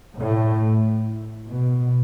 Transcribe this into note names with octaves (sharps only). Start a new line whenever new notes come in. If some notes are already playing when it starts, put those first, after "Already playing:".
A2
B2